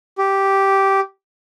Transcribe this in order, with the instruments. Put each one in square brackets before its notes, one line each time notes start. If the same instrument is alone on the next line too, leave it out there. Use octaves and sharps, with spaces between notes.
[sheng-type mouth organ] G4